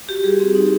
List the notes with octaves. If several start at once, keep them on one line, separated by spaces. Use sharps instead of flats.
F#4 G4
G3 G#4
C4
D#4